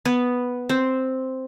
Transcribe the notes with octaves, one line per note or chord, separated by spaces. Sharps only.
B3 B4
C4 C5